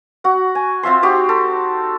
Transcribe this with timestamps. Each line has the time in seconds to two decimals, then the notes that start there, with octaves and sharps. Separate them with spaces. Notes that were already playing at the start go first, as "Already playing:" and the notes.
0.24 F#4 F#5
0.55 G#5
0.83 C4 F4 E5 C6
1.03 D#4 F#4 G4 C5
1.29 A4